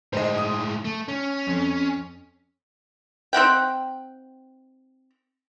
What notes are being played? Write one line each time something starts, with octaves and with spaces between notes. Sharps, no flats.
A2 G#3 C5 D#5
D#6
A3
C#4
F2
C4 D#4 F#5 G5